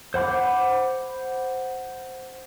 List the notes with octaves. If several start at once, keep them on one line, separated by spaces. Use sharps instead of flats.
C5 F#5 B5 D6